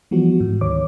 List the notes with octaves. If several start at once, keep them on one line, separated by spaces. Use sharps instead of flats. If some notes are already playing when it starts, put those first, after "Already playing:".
E3 F3 G3 B3 F#4
G#2
D2 D#3 C#5 D6